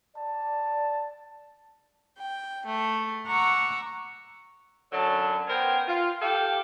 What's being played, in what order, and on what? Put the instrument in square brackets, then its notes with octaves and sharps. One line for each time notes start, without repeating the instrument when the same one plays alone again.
[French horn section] D5 [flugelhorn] A5
[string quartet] G5
A3
F#5 A#5 C#6 D6 E6
[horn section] F#2 D3 F#3 C#5 A5
B3 C#4 A#4 C5 G5
F4
G4 A4 F5 G5